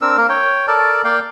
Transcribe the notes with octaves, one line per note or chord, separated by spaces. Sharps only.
C4 D4 A#4 E6
A#3 A#4
C#5 G5
A4 A#4 D5 A5
A#3 D5 F5 G5